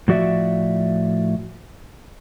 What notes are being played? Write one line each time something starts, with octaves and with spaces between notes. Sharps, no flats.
A2 F3 F#4 D5 E5